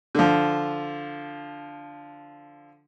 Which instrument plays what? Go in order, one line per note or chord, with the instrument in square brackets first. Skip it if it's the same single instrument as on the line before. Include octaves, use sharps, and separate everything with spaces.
[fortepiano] D3 F3